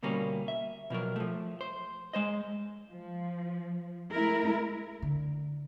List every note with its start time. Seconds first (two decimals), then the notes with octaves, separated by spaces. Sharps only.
0.03 D2 B2 G3 A#3 C#4
0.48 E5
0.90 B2 F3 F#3 A#4
1.16 F3 A3
1.61 C5
2.13 G#3 C5 D#5
2.91 F3
4.12 G#3 A3 E4 A#4
5.02 D3